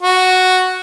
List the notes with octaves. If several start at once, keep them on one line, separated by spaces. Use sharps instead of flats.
F#4